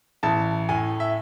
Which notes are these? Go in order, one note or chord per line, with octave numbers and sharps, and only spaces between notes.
A1 A5
A2 G#5
E5